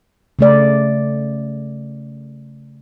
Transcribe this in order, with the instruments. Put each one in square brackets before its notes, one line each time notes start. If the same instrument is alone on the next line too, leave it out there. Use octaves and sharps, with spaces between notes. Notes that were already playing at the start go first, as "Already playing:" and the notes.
[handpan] C#3 A3 D5